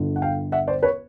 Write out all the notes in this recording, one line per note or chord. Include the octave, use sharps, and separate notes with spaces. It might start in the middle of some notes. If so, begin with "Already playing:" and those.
Already playing: G1 G2 D3
F#5
F5 G5
E5 F#5
C5 D5
B4 C#5